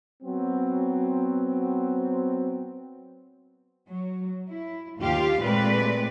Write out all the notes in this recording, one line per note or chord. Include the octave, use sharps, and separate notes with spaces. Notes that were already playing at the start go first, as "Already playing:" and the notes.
F#3 B3 C4
F#3
E4
D#2 F4 G4 F5
A#2 G#3 A3 C4 B4 D5